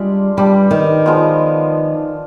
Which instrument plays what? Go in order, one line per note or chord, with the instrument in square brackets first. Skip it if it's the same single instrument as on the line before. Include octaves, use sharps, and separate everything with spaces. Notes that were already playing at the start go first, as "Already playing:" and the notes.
Already playing: [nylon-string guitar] G3 [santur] G#3 D4 F4 G#4 D5
[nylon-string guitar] G3 [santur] D4 G4 B4
[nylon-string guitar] D#3
[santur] F3 G#3 B3 F4